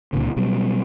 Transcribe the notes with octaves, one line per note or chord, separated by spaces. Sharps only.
C#2 A#2 D3
B2 F#3 G3